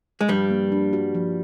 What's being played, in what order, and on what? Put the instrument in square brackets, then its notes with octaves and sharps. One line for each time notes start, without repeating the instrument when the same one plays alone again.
[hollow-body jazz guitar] G#3
[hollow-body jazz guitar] G2 G3 [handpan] F3
[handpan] A#3
D4
F#4
F3